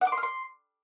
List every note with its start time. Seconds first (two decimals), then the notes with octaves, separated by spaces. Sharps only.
0.01 F#5
0.07 D6
0.12 C6
0.18 F6
0.23 C6